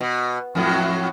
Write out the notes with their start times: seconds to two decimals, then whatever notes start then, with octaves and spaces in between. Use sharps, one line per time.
0.01 B2
0.55 F2 A2 F#3